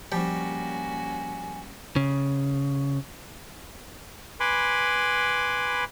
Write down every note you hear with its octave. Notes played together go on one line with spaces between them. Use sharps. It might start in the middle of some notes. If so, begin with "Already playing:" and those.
F3 G3 A#3 C#4 F#4 G#5
C#3
B4 G#5 B5 C6 D6